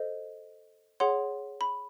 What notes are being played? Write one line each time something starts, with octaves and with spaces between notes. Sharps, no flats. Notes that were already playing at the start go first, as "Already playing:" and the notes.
Already playing: A4 C5 D#5
G#4 C#5 F#5 C6
B5